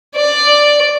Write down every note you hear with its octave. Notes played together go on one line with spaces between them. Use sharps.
D5